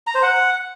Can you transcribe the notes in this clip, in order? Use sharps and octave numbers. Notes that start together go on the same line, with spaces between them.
A#5
C5
F#5